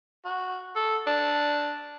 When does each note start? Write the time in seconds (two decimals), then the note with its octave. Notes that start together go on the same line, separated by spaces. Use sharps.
0.25 F#4
0.76 A4
1.07 D4